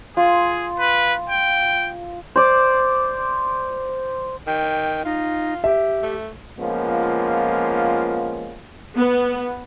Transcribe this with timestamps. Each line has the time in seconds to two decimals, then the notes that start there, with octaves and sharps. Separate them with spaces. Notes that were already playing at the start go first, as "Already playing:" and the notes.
0.17 F4 G#4
0.79 B4
1.29 G5
2.36 C5 D5
4.47 D#3 G5
5.05 D#4 F4
5.64 G4 E5
6.03 A3
6.59 F3 G#3 A#3 B3 C#4 F4
8.97 B3